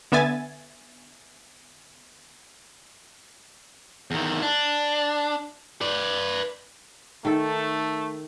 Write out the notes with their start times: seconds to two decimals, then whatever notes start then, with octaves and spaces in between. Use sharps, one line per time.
0.12 D3 B3 E5 G#5 A6
4.11 E2 D#3
4.42 D4
5.81 B4 D5
7.25 D#3 A3 A4